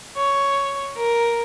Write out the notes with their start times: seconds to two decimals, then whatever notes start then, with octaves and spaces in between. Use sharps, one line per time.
0.17 C#5
0.97 A#4